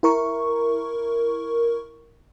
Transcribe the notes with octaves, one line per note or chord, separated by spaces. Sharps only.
E4 A#4 C#6